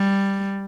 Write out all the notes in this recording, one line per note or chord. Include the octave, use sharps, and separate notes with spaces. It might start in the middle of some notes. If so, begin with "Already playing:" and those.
Already playing: G3